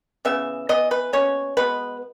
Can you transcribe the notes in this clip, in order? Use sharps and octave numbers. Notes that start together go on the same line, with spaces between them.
C#3 E3 B3 E5
E3 B3 D#5
B4
B2 A#3 C#4 C#5
B2 G#3 B3 B4